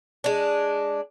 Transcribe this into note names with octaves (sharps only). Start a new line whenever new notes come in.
G#3 D4